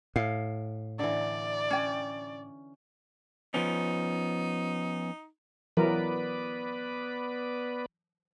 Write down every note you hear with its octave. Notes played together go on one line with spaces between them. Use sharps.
A2 F5
D3 E3 D5
C#4 G5
F3 B3 C#4 D#4
E3 F#3 B3 A#4 B4 D5